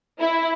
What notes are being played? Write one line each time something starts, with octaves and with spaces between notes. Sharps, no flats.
E4